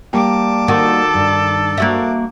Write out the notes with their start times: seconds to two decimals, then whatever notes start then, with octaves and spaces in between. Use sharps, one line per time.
0.13 G3 A#3 G5 A5 D6
0.68 D#3 F#4 A4
1.14 G2
1.78 A#3 F#4 E5